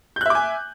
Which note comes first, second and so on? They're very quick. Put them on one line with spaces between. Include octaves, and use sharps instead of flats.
G6 F#6 E5 D6 G#5